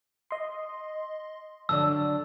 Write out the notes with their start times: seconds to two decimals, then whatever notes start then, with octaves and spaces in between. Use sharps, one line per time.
0.31 D#5 C6
1.69 D3 F#3 D5 A5 E6